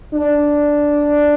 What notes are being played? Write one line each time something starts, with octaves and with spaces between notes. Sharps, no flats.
D4